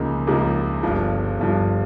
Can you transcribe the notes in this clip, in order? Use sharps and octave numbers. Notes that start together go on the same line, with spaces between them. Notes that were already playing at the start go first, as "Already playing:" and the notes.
Already playing: C#2 C#3 F3 A#3 D#4
C#2 C#3 F3 A#3 D#4
G1 G2 F3
G1 G2 F3